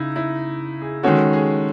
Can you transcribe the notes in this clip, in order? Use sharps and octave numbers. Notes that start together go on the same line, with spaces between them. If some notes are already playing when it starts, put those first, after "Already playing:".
Already playing: C#3 D#4 E4
E4
G#4
D#3 G#3 C#4 F#4 A4
G#4